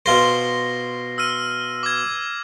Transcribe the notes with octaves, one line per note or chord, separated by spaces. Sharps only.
B2 F4 C5 A#6 C7
E6 F6 D#7
D6 G#6